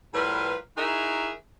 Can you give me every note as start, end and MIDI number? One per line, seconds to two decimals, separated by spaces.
0.14 0.55 45
0.14 0.55 53
0.14 0.55 55
0.14 0.55 70
0.14 0.55 71
0.77 1.30 63
0.77 1.30 64
0.77 1.30 66
0.77 1.30 68
0.77 1.30 70
0.77 1.30 76